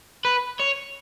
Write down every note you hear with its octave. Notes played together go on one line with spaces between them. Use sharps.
B4
C#5